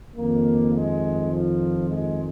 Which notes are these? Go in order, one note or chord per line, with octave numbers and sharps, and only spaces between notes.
F2 D#3 A#3
G#3
F3
G#3